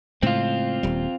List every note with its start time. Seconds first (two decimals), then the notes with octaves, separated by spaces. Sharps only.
0.23 A2 C#3 G#3 C4 F4
0.83 D#1 G3